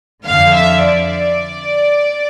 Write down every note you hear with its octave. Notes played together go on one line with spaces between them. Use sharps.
F2 D3 F5
E5
D5